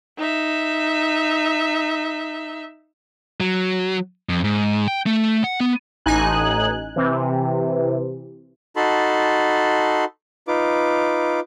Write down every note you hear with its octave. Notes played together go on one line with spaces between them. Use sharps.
D#4 E5
F#3
F2
G#2
G5
A3
F#5
B3
A1 D#4 G#5 F#6
C3 E3
D#4 F#4 A4 A5 B5 C6
D#4 F4 B4 D6